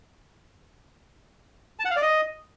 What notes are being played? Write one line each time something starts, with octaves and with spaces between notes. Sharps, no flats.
A5
F#5
F5
D5
D#5